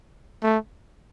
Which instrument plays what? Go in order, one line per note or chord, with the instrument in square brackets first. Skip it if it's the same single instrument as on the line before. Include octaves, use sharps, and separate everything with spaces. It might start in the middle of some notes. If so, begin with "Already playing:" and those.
[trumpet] A3